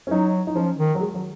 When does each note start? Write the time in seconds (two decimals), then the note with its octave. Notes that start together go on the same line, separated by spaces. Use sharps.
0.07 C#4
0.11 F#3 D#4
0.47 D#4
0.55 F3 C#4
0.78 D#3
0.95 F#3
1.00 G#3
1.15 F#3